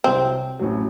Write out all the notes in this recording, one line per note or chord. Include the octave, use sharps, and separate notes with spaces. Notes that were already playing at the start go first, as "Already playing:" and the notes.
C2 C3 F#3 C4
A1 A2 F#3